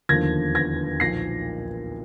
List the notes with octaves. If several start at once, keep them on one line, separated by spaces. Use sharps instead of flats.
E1 D#2 D3 F3 G#6 A#6
G#6 A#6
B1 A#2 F3 A#6 C7